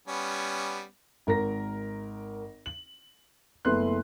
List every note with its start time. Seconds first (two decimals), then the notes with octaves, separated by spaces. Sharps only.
0.08 G3 B3 C#4
1.27 G#1 A#4 A#5 A#6
2.66 F#7
3.65 F#1 A3 B3 B4 C6 F#6